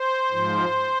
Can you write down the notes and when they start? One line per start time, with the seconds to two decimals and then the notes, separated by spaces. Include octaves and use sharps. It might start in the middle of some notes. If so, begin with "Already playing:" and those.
Already playing: C5
0.32 G#2 F3